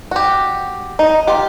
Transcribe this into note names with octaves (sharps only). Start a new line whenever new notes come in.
F#4 G4
D#4
F4 G4